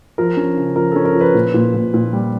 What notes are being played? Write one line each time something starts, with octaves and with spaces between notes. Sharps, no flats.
F3 A#4
C#4
C#3
F3 A#4
C#4 A4
A#4
F3
B4
A#2
A#2
A#2
A#2
G3